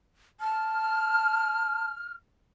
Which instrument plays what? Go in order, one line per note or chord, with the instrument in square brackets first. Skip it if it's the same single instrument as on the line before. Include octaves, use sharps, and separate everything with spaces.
[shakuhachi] A5 [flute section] F6